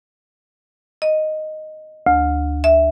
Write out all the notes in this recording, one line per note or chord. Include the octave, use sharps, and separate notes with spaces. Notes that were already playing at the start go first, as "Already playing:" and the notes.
D#5
D2
E5